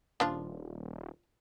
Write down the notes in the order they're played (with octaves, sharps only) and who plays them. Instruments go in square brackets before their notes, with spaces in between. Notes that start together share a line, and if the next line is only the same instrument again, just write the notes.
[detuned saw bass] D#1 [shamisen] F3 D4 F4